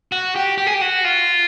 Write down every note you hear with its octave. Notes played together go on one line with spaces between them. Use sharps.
F#4
G4
G4
G#4
G4
F#4
F4